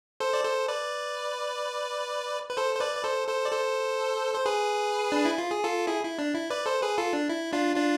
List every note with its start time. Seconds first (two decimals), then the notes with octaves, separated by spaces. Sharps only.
0.20 A4 C5
0.33 D5
0.44 A4 C5
0.68 B4 D5
2.49 B4
2.57 A4 C5
2.75 C5
2.80 B4 D5
2.97 D5
3.04 A4 C5
3.28 A4 C5
3.45 D5
3.52 A4 C5
4.34 C5
4.46 G#4 B4
5.12 D4
5.25 E4
5.38 F4
5.51 G#4
5.64 F4 A4
5.87 E4 G#4
6.03 E4
6.19 D4
6.35 E4
6.50 B4 D5
6.66 A4 C5
6.82 G#4 B4
6.98 F4 A4
7.13 D4
7.29 E4
7.53 D4 F4
7.76 D4 F4